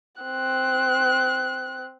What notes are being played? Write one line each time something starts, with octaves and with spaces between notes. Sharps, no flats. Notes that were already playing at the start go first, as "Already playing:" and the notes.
C4 F#6